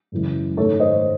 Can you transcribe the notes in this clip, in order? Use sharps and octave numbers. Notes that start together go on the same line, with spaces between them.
F#2 C#3 E3 G#3
G#2 D#3 A3 A4 C#5
C5 D#5